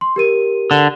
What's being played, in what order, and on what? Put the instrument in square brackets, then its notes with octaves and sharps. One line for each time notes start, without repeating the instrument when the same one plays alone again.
[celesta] C6
G4 A#4 D#7
[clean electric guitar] D3